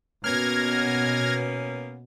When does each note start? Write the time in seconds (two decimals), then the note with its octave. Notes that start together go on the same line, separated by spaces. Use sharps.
0.24 B2 A#3 B3 C#4 F6 G#6 A#6